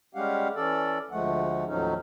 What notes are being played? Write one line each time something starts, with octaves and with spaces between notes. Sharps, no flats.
G3 G#3 C#4 G4 F5 F#5
E3 C#4 A4 D5
D2 F3 G#3 A3 F#5
D#2 A2 F3 F#3 C#4 D#4